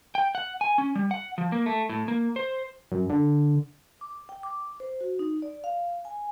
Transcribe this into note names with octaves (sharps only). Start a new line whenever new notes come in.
G5
F#5
G#5
C#4
G3
F#5
F3
A#3
A3
A2
A#3
C5
F#2
D3
D6
G5
D6
C5
F#4
D#4
D5
F5
G#5